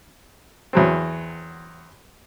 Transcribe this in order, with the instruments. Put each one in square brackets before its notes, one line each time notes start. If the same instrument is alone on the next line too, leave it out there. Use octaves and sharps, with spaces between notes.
[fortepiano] E2 F#3 C4